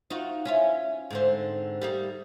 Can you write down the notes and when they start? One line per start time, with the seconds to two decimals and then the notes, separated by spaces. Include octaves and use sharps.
0.10 D#4 F4 F#4
0.45 C#4 E4 F4
1.11 G#2 D3 C4
1.82 G3 A#3 D#4